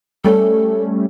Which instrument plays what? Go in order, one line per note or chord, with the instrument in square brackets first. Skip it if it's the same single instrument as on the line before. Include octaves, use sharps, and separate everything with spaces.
[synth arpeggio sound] G3 A3 C#4 [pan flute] A4